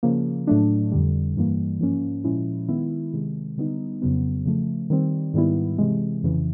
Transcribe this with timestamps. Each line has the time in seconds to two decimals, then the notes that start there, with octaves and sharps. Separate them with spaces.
0.03 C#3 F3 A#3
0.47 A2 F#3 A3 D4
0.92 F2 D3 G3
1.36 G2 E3 G3 A#3
1.80 G#2 F3 A#3 C#4
2.24 A#2 F3 G#3 C#4 E4
2.68 D#3 G#3 B3 E4
3.13 C3 D#3 G#3
3.57 D3 G3 B3 D#4
4.02 F2 C#3 F#3 B3
4.46 C#3 F3 A3
4.90 D#3 G3 C4
5.34 G#2 D#3 G3 B3 E4
5.78 C3 E3 G#3
6.23 F2 C#3 E3